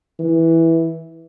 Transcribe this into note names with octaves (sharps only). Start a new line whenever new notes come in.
E3